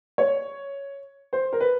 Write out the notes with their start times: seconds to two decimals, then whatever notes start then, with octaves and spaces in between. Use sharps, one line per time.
0.18 C#5
1.33 C5
1.53 A#4
1.60 B4